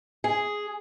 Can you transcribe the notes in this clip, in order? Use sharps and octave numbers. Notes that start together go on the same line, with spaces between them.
G#4